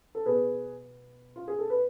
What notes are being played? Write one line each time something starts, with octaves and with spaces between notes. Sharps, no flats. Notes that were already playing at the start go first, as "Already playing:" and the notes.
A4
B2 B3 G#4 B4
F4
G#4
A4
B4